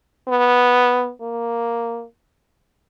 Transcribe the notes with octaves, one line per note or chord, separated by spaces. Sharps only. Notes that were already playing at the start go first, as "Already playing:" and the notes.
B3
A#3